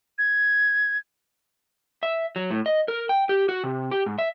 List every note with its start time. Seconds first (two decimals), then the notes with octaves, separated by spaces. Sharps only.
0.18 G#6
2.03 E5
2.36 F#3
2.51 A2
2.66 D#5
2.88 A#4
3.09 G5
3.29 G4
3.49 F#4
3.64 C3
3.91 G4
4.06 G#2
4.18 E5